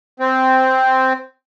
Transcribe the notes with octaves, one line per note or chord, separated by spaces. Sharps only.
C4